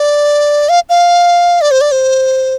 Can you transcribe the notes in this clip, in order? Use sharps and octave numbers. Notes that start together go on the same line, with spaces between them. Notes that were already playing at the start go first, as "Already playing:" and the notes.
Already playing: D5
F5
F5
D5
C5
D5
C5